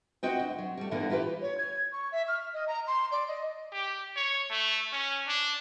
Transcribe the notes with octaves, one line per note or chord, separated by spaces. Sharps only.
C4 F4 F#4 D#5 F#5 G5
D2
F#3
G3 A3
G2 A#2 D3 E3 A#3 B3
E4 F4 G4 B4
C#5
G#6
C#6
E5
F6
D#5
A#5
C6
D5
D#5
G4
C#5
A3
C#4
D4